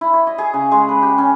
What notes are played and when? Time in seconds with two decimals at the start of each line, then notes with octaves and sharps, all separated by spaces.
0.01 E4
0.13 C#5
0.27 D#5
0.38 G#4
0.54 C#3
0.72 G#3
0.89 B4
1.02 G4
1.18 C#4